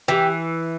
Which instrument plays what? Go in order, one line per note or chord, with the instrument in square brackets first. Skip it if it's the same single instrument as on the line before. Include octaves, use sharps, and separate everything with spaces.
[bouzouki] E3 [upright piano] G4 G5